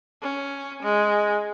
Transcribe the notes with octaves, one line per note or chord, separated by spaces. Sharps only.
C#4
G#3